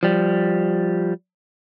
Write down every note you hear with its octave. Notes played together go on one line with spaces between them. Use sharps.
F3 G3